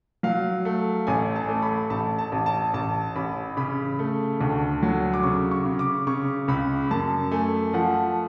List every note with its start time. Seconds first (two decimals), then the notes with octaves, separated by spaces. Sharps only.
0.23 F#3 F5
0.65 A3
1.07 A1 G#5
1.36 A5
1.49 A3
1.62 B5
1.90 A1 A5
2.18 A5
2.32 A1
2.46 A5
2.74 A1 A5
3.16 A1 B5
3.57 C#3 B5
3.99 A3
4.41 D2
4.83 F#3
5.14 D6
5.23 C#3 C#6
5.51 C#6
5.65 C#3
5.79 D6
6.07 C#3 C#6
6.48 C#2 B5
6.91 F#2 A5
7.31 A3 G#5
7.73 F3 F#5